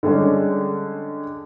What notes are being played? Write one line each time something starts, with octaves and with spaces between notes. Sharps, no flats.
D3 G3 G#3 C#4 D4